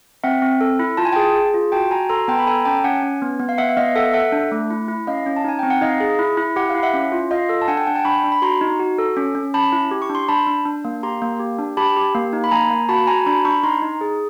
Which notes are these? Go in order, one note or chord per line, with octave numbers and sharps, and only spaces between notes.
C4 E5 F#5
C4
A4
E4
F4 A5
G#5
G#4 G5 A5
G#4
F4
F#4 G5 A5
F#4 G#5 A#5
A4 A#5 C6
B3 G5 A5
B5
A4 G#5 A#5
C#4 G5 A5
C#4 F#5 G#5
C#4
B3
B3
F5
B3 E5 F#5
E5
B3 D#5 F5
A4 E5 F#5
A4 E5 F#5
D4
A3
E4
E4
C#4 D#5 F5
C#4
A5
D#4 G#5
C4 G5
F#5
D#4 D#5 F5
G#4
E4
E4
G4 F#5
F5
E4
E5 F#5
C#4
F4
F4 D#5 F5
A4
A5
D4 F#5 G#5
G5 A5
D4 F#5 G#5
G5 A5
D4 B5 C#6
D4
B5
F#4 A#5 C6
D#4
F#4
A4
C#4
C#4
C#4 A5 B5
E4
G4
C#6
D4
C6
D4 A5 B5
D4
D4
A#3
G4 A#5 C6
A#3
G4
D4
G4 A5 B5
G4
A#3
D#4
B5
A#3 G#5 A#5
A#3
F#4 A5 B5
F#4 G#5 A#5
A#5
D4 A5 B5
D4 B5 C#6
D#4 A#5 C6
D#4
G#4